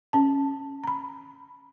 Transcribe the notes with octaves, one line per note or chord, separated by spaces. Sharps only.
C#4 A5
A#5 B5